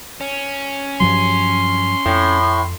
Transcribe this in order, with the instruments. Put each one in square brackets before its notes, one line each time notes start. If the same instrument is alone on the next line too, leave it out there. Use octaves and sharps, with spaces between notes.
[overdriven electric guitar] C#4
[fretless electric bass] G2 F3 F#3 [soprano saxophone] C6
[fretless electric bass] F2 [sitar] A2